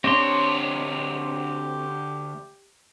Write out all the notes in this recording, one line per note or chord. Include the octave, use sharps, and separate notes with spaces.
D2 C4 D4 G4 C#5 C6